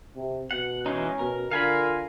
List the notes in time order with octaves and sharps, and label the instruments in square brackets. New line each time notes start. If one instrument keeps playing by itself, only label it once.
[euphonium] C3
[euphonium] B2 [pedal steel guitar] F#5
[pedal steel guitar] E3 G#3 D#4 [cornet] C#4
[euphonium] B2 [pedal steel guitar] A#4
[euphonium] D3 [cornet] F4 [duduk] A#4 [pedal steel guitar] F5 G#5 B5